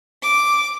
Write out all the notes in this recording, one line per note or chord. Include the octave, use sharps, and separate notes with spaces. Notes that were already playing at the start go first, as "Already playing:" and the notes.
D6